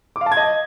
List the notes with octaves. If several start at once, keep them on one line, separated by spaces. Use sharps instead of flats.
D6
F5
A5
G#6
D#5